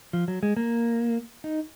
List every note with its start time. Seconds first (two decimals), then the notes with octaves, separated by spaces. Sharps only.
0.13 F3
0.28 F#3
0.43 G#3
0.57 A#3
1.44 D#4